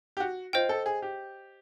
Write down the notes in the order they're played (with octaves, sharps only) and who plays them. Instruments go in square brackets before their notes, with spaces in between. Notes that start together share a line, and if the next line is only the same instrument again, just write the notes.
[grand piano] G4
F#4
[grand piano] F4 [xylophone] C5 D#5 G5
[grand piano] A4
G#4
G4